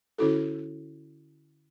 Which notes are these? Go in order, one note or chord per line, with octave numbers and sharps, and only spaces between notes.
D3 C#4 E4 F#4 A4